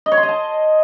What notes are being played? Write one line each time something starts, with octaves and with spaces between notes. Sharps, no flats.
D#5
C#5
C6
D#5
A5